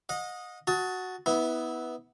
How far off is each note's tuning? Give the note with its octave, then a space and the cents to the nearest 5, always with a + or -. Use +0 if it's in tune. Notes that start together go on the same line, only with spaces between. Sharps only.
D#5 +0 F#5 -40
F#4 +0 A5 +0 D#6 +30
B3 +0 E4 -25